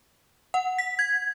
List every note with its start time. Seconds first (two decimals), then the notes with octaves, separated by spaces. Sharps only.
0.54 F#5
0.78 B6
0.99 G#6